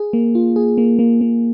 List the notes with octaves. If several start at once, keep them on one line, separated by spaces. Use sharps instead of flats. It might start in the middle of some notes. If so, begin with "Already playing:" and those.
Already playing: G#4
A#3
F4
G#4
A#3
A#3
A#3